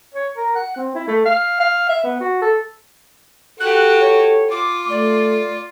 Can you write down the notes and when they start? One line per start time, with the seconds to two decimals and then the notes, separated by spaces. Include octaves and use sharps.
0.14 C#5
0.36 A#4
0.55 F#5
0.76 C4
0.95 E4
1.08 A3
1.25 F5
1.60 F5
1.89 E5
2.04 B3
2.20 F#4
2.42 A4
3.60 F#4 G4 A4 F#6
4.00 C#5
4.50 F4 D6
4.89 A3 D5